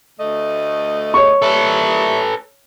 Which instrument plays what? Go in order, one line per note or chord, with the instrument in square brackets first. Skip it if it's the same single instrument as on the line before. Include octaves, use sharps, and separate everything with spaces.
[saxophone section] D2 A3 D#5
[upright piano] C#5 C#6
[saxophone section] A#2 G3 E5 [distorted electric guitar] A4 B4